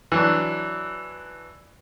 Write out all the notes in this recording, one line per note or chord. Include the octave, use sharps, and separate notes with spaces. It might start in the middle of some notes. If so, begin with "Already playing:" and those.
E3 F#3 D4